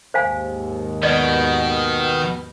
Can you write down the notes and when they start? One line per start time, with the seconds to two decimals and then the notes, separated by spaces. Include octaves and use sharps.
0.14 D#2 G#2 C5 F5 G#5
1.03 B2 D#3 D5 D#5